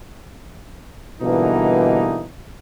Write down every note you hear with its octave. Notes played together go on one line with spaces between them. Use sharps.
B2 D3 E3 G3 A#3 D#4